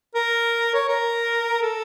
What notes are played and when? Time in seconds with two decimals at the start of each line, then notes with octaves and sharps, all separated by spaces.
0.15 A#4
0.74 C#5
0.89 A#4
1.62 A4